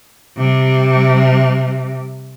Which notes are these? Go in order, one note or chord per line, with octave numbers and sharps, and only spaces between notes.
C3 G3